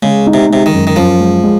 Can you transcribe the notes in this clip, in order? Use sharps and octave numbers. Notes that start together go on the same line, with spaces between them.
C#3 G#3
D#4
C3
C3 G#3
D#3
F#2
D#3
F#2 F3
G#3
G#3